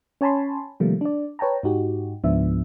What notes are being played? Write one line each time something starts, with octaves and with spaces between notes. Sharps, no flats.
C#4 C#5 G#5 A5 B5 C6
C3 D#3 F3 G3 A3 A#3
D4 D5
B4 C#5 G5 A5 A#5
G#2 D#4 F#4 G4
C#2 G#2 F3 B3 D4 E5